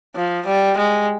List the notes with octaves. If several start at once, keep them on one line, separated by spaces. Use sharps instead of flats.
F3
G3
G#3